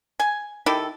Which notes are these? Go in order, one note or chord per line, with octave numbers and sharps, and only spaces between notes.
G#5
D#3 E4 G4 A4